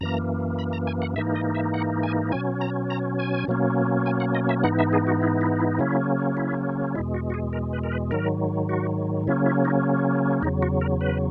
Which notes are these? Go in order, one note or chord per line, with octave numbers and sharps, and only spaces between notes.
F#2 E3 A#3 A#5
B5
A#5
G#5
F#5
G#2 E3 A#3 D#4 E5
D#5
E5
F#5
G#5
B2 F#3 C#4 G#5
A#5
A#5
G#5
B2 F#3 A#3 C#4
G#5
F#5
D#5
E5
G#2 E3 B3 D#4 F#5
E5
G#4
F#4
E4
E4
E4
C#3 F#3 A#3 C#4 E4
E4
E2 B2 G#3 E4
F#4
F#4
G#4
A#4
B4
A#4
B4
G#2 D#3 F#3 A#4
F#4
C#3 F#3 A#3 C#4 E4
E4
D#4
E2 C#3 F#3 D#4
F#4
A#4
B4